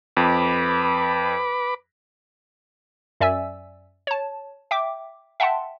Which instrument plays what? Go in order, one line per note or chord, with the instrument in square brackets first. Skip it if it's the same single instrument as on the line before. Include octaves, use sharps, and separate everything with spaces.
[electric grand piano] F2 [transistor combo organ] B4 B5 D6
[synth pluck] F#2 D5 E5 G#5 E6
C#5 A5
E5 G5 D6
E5 F#5 G5 A5 C6